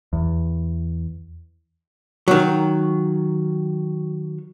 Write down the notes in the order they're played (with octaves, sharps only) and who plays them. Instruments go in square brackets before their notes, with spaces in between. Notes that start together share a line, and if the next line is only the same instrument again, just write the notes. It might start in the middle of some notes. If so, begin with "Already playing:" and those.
[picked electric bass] E2
[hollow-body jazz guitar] D#3 F#3